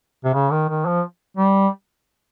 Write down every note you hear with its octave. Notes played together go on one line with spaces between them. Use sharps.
C3
C#3
D#3
D#3
F3
G3